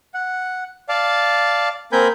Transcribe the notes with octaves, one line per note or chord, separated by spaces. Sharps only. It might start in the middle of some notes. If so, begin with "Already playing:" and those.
F#5
D5 F5 A5
A#3 C4 A#4 G#5 B5 G6